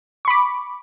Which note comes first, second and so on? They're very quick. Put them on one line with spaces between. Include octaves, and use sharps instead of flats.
C#6 B5 D6